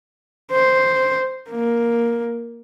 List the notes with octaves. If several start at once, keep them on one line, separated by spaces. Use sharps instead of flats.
C5
A#3